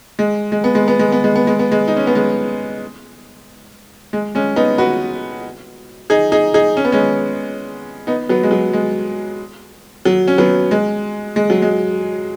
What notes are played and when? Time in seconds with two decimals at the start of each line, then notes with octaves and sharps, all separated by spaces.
0.19 G#3
0.52 G#3
0.64 B3
0.75 G#3
0.88 B3
0.99 G#3
1.12 B3
1.24 G#3
1.36 B3
1.47 G#3
1.59 B3
1.72 G#3
1.88 D#4
1.97 C#4
2.07 B3
2.15 G#3
4.13 G#3
4.35 G#3 C#4
4.56 B3 D#4
4.78 F#4 B4
6.10 D#4 G#4
6.32 D#4 G#4
6.54 D#4 G#4
6.77 C#4
6.85 B3
6.92 G#3 C#4
8.07 B3 D#4
8.29 F#3 B3
8.43 G#3
8.51 F#3
8.73 G#3
10.05 F#3
10.28 C#4
10.38 F#3 B3
10.71 G#3
11.36 G#3
11.50 F#3
11.62 G#3